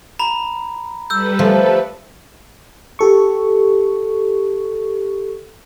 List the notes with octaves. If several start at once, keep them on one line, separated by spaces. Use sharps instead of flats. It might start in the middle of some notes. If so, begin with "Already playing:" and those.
A#5 B5
G3 A4 B4 E6 G6
F3 A3
G4 A4 C#6